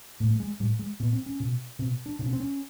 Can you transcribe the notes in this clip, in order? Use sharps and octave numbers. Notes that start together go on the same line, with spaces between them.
A2 A3
A3
G#3
A2 G3
G#3
A#2 B3
C4
C#4
B2
B2 C4
D4
B2 D4
C#4
C4
C#4